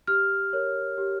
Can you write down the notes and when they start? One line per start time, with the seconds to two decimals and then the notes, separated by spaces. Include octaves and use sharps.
0.07 G4 F6
0.53 A#4 C#5
0.98 G4